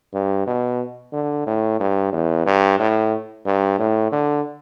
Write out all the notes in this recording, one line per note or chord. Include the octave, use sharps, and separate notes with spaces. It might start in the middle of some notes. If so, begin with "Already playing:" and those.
G2
B2
D3
A2
G2
E2
G2
A2
G2
A2
D3